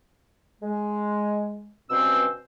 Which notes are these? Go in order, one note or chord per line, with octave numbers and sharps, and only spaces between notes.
G#3
G2 B2 C4 C#4 C5 E6